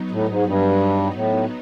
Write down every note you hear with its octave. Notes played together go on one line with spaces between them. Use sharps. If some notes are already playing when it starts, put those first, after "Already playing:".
Already playing: F#3 B3 D#4
A2
G#2
G2
A2